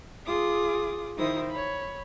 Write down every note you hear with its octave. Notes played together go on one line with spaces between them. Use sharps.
F4 G#4 D6 D#6
D#3 D#4 E4 C5 D#6
C#5 B5